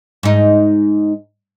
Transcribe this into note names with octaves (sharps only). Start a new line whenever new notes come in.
G#2 D#4